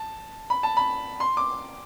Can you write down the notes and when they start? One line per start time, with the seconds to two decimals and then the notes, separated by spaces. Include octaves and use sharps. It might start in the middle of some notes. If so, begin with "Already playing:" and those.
Already playing: A5
0.50 B5
0.63 A5
0.77 B5
1.20 C6
1.37 D6